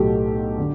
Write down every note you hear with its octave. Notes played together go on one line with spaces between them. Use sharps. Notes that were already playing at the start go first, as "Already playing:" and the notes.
Already playing: B1 A2 F#3 A3 G4
D3